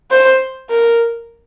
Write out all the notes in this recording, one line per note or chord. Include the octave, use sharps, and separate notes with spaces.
C5
A#4